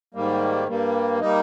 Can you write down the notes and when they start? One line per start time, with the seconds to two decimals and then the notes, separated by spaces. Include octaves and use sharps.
0.14 G#2 D#3 G3 A#3
0.68 G2 G3 A#3
1.20 G3 A#3 D#4